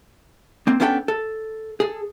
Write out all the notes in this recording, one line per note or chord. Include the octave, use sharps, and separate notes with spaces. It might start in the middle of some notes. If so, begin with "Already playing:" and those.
A#3 C4
B3 C#4 D4 E4 A4 G5
A4
G#4 A4